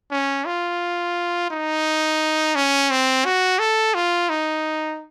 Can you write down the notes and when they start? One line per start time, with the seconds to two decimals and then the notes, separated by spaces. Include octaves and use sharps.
0.11 C#4
0.46 F4
1.51 D#4
2.55 C#4
2.91 C4
3.25 F#4
3.59 A4
3.94 F4
4.30 D#4